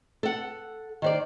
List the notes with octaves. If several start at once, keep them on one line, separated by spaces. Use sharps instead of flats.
A4 F#5
D#3 C5 D5